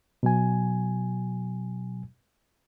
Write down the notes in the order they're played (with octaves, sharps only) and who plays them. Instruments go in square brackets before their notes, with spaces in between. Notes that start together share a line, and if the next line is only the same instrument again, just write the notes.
[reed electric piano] B2 F#3 G#5